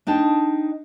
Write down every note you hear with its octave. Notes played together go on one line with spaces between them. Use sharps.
D4 D#4 G5 A5